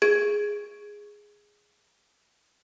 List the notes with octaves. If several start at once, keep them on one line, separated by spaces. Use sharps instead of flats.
G#4 G#6 D7